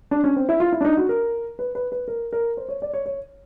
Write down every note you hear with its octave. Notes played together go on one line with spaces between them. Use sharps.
D4
C#4
C4
E4
F4
E4
D4
D#4
F#4
A#4
B4
B4
B4
A#4
A#4
C5
C#5
D5
C#5
C#5